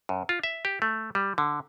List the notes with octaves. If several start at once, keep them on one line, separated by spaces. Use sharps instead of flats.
F#2
F4
E5
G4
A3
G3
D3